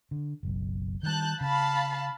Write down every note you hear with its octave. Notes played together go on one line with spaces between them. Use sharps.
D3
F#1 B1
D#3 G3 A5 F#6 G6
C#3 F5 A5 B5